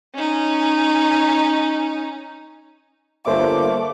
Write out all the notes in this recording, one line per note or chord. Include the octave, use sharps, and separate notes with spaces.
C#4 D#4
G1 A3 A#3 C5 C#5 E5 D6